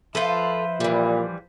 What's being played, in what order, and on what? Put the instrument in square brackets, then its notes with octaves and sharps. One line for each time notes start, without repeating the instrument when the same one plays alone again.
[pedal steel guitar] F3 B4 C5 [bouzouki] F4 A4 [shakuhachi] E5
[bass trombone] A#2 [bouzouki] E3 G3